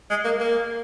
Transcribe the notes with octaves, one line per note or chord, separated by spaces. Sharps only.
G#3
A#3
A#3